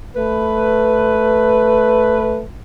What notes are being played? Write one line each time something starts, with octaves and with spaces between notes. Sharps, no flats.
A3 B4